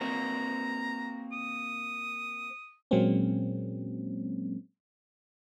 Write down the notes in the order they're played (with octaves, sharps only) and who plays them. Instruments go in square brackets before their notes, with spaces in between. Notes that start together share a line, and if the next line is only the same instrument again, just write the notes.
[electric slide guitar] A#3 C4 F#4 [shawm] A#5
[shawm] D#6
[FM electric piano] A#2 F#3 G#3 A#3 C4 C#4